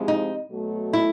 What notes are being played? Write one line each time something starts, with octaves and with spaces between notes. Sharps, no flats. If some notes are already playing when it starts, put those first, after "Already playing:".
Already playing: C3 F3 G#3 C4 E4
D#4
B2 F#3 A3
E4